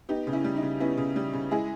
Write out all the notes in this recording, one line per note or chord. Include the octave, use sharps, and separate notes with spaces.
B3 D#4 G4
C#3
C#4 E4
G3
D#4
C#3
B3 C#4 E4
C#3
G3
C#3
G#3 E4 G#4